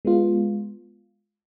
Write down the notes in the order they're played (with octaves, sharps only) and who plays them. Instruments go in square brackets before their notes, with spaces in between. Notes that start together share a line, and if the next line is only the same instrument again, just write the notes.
[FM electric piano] G#3 B3 F4